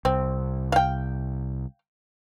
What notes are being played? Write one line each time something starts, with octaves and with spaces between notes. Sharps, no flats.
C2 C4
F5 G5